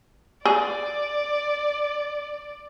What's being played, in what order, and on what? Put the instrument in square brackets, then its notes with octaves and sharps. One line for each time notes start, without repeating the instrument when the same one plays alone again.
[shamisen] G#4 [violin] D5